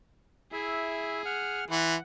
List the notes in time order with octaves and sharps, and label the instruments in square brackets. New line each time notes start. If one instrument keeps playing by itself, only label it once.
[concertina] E4 E5 [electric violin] G#4
[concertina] F#5 F6
[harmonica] E3 [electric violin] F#5 [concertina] C6